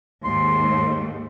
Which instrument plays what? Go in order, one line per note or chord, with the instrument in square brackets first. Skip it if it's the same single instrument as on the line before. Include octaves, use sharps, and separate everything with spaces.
[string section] D#2 G#2 [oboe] C6